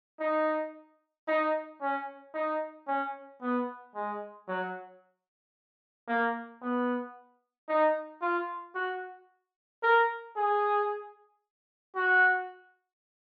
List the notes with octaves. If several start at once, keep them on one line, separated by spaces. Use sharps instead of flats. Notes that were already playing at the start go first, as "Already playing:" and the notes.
D#4
D#4
C#4
D#4
C#4
B3
G#3
F#3
A#3
B3
D#4
F4
F#4
A#4
G#4
F#4